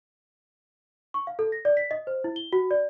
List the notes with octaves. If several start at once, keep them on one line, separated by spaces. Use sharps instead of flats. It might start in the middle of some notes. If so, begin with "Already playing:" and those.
C#6
F5
A4
A#6
D5
B6
D#5
C5
E4
G7
F#4
D5